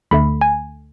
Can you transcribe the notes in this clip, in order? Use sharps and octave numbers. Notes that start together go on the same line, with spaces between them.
D2 D3 A3 B5
G#5